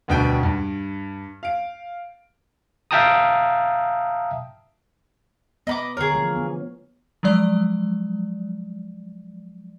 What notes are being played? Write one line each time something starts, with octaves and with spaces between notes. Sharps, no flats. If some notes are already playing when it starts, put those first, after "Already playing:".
D2 G2 B2 D4 G5 D7
G2
F5 D7
E5 F5 G5 A5 A#5 D#6
B3 D#5 B5 D6
D3 A#3 G#4 C#5
E3 F3 A3
B3
F3 F#3 G#3 D5